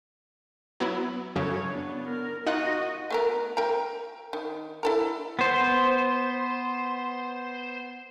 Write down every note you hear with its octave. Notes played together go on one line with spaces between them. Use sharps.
F#3 B3 E4
F#2 C#3 A4 C#5
B3 D4
A#4
D#4 F4 F#4 D#5 F#5
A3 B3 A#4
A#4 G5 A#5
D#3
E4 A4 A#4
B3 C5